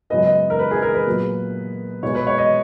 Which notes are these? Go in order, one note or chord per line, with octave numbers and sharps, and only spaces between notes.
F#2 C#3 G#3 B3 D#5
D#5
A#4
B4
G#4
A#4
B4
A#2 F#3 B3
B2 G#3 B3 C#5
B4
C#5
D#5